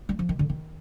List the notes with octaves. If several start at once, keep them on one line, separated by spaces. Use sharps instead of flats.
G3
F3
D#3
D3
D#3